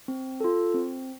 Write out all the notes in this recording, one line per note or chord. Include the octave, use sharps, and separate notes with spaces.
C4
F4 A4
C4